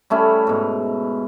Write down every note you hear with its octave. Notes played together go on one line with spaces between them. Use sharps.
G3 A3 C#4 E4
G#2 B2